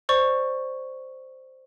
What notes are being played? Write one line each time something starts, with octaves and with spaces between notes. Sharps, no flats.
C5 D5 C#6